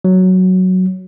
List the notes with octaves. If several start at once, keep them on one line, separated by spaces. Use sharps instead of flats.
F#3